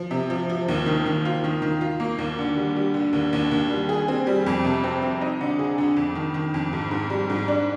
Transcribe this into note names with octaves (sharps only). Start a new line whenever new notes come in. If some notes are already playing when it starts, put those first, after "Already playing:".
Already playing: F3
C3
F3
F3
D#2
D#3
D#3
F4
D#3
D#3
F4
A#3
D#2
D3
G3
G3
D3
D#2
D#2
D#2
G3
G#4
C4
G3
F2
C3
C4
C4
D#4
D3
G#4
D3
F2
D#3
D#3
F2
G#2
G#2
G3
G#2
D4